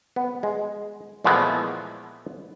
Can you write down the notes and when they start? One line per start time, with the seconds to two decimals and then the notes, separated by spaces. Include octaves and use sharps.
0.16 B3
0.43 G#3
1.24 A#2 E3 F3 G#3 A3 B3